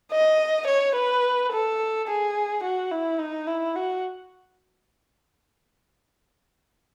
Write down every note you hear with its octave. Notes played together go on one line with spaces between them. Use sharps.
D#5
C#5
B4
A4
G#4
F#4
E4
D#4
E4
F#4